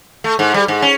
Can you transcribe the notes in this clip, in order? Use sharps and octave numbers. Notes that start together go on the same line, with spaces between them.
A3
G#2
G3
G#2
C#4